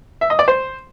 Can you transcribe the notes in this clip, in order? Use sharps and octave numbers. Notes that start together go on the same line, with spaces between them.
E5
D#5
D5
C5